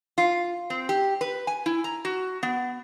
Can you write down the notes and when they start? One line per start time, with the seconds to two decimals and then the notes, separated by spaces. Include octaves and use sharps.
0.18 F4
0.70 C4
0.89 G4
1.21 B4
1.47 G#5
1.66 E4
1.84 A#5
2.05 F#4
2.43 B3